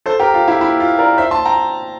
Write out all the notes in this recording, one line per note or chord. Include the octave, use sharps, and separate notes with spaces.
A4 C5
G4 A#4
F4
E4 G4
E4
F4
A#4 D5
C5 E5
A5 C6
G5 A#5